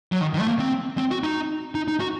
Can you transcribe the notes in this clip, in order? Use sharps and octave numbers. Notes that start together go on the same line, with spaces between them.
F#3
D#3
D#3
A3
A#3
C4
C4
F#4
D#4
D#4
D#4
F#4